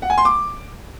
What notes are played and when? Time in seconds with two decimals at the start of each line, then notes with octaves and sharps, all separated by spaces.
0.02 F#5
0.10 G#5
0.18 C6
0.25 D6